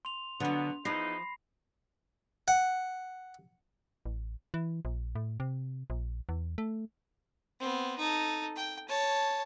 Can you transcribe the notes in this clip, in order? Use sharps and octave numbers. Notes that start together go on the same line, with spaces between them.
C6 F7
B2 D3 F#3 B3
E2 F3 D#4 B5 A#6 C7
F#5
A1
E3
A#1
A2
C3
A#1
E2
A3
B3 C4
D#4 A4
G5
C#5 A5